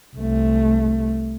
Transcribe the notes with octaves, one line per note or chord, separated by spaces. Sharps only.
C2 A3